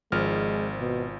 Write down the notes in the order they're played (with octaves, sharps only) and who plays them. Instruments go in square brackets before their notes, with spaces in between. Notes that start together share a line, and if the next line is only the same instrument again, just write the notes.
[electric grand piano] G#1 F3 F6 [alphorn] G#3
[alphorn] B2